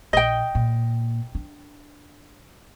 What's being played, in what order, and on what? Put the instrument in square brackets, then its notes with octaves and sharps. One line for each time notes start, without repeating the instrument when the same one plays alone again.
[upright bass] A#1 [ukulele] D#5 G5
[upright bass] A#2
D4